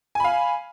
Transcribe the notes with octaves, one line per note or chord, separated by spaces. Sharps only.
F5 G#5 B5